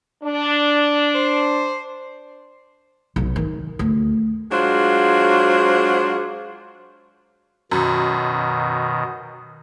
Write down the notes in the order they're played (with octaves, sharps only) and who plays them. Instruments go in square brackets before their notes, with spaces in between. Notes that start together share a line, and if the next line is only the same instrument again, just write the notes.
[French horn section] D4
[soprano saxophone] C5
[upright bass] B1
D#3
D2
[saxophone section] F#3 G#3 D4 F4 F#4 C5
[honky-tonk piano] F#2 [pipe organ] B2 D#3